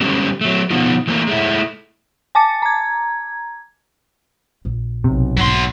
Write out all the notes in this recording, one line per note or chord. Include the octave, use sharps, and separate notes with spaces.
D3 G3 G#3 C#4 G4 A4
F#3 A3
B2 D3 F3 B3 D#4 F4
E3 A3 A#3 A#4
G#3 A3 E4
G#5 A5 D6 A6 C#7
A#5 G#6
A#1
B1 C3
G#2 F#3 A#3 C6